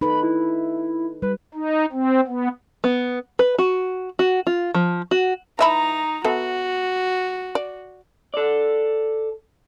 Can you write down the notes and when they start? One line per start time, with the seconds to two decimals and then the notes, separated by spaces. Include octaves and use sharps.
0.01 D#4 A4 B4 B5
0.23 E4
1.22 G3 B4
1.54 D#4
1.92 C4
2.27 B3
2.84 B3
3.39 B4
3.58 F#4
4.19 F#4
4.47 F4
4.74 F3
5.11 F#4
5.59 E3 D#4 E5 A#5 B5
6.24 B3 F#4 A4 E5
7.55 D5
8.34 A4 D5